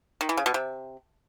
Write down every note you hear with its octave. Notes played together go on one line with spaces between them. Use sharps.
D#3
E3
C#3
B2
C3